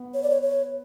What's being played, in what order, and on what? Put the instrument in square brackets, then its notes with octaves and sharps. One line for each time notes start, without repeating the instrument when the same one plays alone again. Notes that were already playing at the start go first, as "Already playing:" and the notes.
Already playing: [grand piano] B3
[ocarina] C#5
D5
C#5
C#5